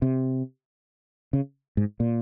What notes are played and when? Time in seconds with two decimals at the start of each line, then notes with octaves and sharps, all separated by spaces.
0.02 C3
1.33 C#3
1.77 G#2
2.00 A#2